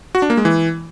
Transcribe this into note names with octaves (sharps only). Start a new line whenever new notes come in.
F#4
D4
A#3
G#3
E3